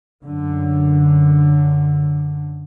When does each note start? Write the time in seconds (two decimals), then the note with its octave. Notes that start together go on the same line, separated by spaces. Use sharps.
0.25 F#2 D3